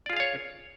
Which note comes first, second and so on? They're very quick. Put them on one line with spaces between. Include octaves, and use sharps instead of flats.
D5 F4 G#4 F5 C#5